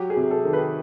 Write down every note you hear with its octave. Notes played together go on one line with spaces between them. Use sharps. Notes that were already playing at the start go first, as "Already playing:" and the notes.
Already playing: F#3 G4
G#4
C3
A4
D#3
B4